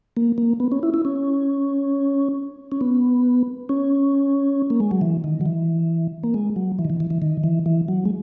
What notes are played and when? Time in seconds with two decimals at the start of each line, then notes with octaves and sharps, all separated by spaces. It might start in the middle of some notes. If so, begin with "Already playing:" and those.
0.17 A#3
0.38 A#3
0.60 B3
0.72 C#4
0.83 E4
0.94 E4
1.05 C#4
2.72 C#4
2.81 B3
3.69 C#4
4.70 A#3
4.80 G#3
4.91 F#3
5.01 E3
5.24 D#3
5.41 F#3
5.46 E3
6.23 A#3
6.34 G#3
6.56 F#3
6.79 E3
6.85 D#3
6.90 E3
7.00 E3
7.10 E3
7.22 D#3
7.44 E3
7.66 E3
7.88 F#3
8.05 G#3